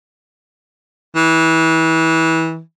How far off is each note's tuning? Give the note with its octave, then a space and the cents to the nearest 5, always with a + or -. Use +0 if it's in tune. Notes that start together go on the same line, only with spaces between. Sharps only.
E3 -25